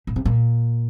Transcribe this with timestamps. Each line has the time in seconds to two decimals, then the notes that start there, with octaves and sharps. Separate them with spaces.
0.07 A#2
0.16 C3
0.25 A#2